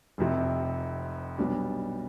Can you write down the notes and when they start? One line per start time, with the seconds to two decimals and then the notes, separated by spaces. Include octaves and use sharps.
0.18 F1 F2 C3
1.38 B1 B2 G3 D4